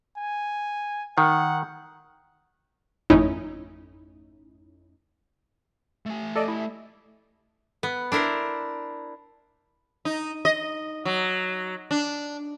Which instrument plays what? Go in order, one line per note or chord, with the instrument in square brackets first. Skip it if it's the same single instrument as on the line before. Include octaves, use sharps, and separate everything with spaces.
[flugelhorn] G#5
[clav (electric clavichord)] D#3 [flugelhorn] F#5
[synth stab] G#1 F2 A3 C#4 D#4 E4
[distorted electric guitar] A3 G#5
[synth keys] A4 D5 D#5
E4
[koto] B3
D4 E4 A#4 C5
[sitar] D#4
D#5
F#3
D4